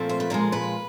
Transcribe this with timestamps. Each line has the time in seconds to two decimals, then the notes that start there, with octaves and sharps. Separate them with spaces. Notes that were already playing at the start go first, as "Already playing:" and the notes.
Already playing: A#2 F3 A3 C4
0.09 C5
0.20 B4
0.30 A#2 F3 G#3 A#4
0.52 B4